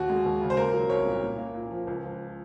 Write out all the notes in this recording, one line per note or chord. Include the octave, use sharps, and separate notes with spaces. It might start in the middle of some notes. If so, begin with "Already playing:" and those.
Already playing: D#2 F#4
G#3
D#2
C#3
C5
A#3 A#4
F#3
C2 C#5
A#2
A#2
A#3
A#2
F3
C#2
F3